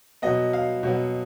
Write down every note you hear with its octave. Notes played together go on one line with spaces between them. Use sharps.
B2 F#3 B3 D#5
F5
B2 F#3 B3